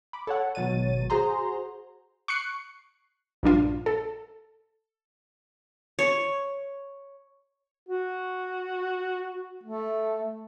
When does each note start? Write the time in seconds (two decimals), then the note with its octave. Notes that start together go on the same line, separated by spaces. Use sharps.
0.13 B5 D6
0.27 A4 C#5 F#5
0.55 G#1 B2 F#3 C#5 A6 D#7
1.10 F#4 G#4 C5 A#5 C6
2.28 C#6 F#6 C7 C#7
3.43 A#1 G2 D4 F4
3.86 A4
5.99 C#5
7.89 F#4
9.64 A3